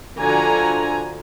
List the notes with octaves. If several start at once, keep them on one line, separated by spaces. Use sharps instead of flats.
D3 F3 F#4 G#5 A#5